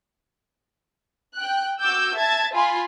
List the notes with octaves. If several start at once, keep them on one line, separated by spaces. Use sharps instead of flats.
G5 F#6
F#4 D6 E6 G6
E5 A5 G#6 A6
F4 G#5 B5 C6